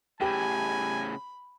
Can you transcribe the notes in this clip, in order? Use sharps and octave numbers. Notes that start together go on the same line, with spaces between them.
A2 C#3 G4 G5 G#5 B5